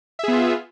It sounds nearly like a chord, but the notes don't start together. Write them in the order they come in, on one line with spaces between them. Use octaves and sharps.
E5 G#4 B3 F4